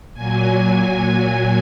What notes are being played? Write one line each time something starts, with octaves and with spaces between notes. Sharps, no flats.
A#2 F#3 G#5